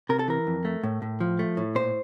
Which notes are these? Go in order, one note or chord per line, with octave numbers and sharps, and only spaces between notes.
C3 A#4
A4
E3 A#4
F2
A3
A2
A2
F3
A3
A2
A#2 C5